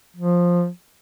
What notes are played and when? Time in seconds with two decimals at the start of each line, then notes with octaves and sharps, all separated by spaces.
0.16 F3